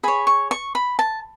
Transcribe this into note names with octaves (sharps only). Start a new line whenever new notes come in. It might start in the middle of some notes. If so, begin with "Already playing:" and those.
G#4 C#5 B5
C#6
C#6
B5
A5